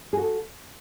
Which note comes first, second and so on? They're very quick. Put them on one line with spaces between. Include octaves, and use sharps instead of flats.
G#4 F#4 A4